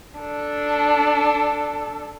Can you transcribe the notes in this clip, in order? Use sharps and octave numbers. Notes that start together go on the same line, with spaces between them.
D4 A4